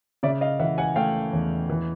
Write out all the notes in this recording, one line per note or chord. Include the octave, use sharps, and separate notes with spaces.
C#3 D5 E5
D#5 F5
E3 E5 F#5
F#5 G#5
A3 F5 G5
E2
E3